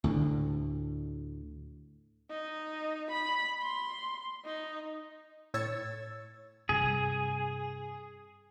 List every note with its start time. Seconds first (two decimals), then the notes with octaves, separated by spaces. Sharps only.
0.04 D2 A2 D3
2.30 D#4
3.11 B5
3.63 C6
4.45 D#4
5.54 A2 C#5 E6 G#6 A6
6.69 G2 C3 G3 G#4